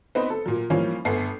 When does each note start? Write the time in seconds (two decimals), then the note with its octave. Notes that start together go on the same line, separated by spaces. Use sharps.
0.15 B3 C4 D#4 B4
0.30 A4
0.46 A#2 F#3
0.70 E3 F3 G3 A#3 C#4
1.05 G1 B3 A4 C7